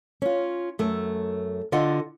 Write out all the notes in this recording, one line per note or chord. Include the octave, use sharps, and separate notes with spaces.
C#4 F4
F#2 A3
D3 F4 D#5 F#5